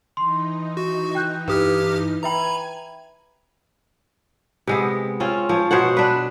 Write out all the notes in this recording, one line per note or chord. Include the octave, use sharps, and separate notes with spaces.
E3 D#4 C6
F#4
G5 F#6 G6
G2 G4 B4 D#6 F6
B4 E5 G5 G#5 A#5 B5
C3 G#3 B3
C4 C#4 F4
F3 C#5
B2 C5 C#5 F#5
D4 B4